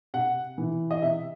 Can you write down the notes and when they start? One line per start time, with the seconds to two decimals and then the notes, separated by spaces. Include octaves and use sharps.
0.14 C3 F#5
0.58 E3
0.91 D#5
1.02 C3 E5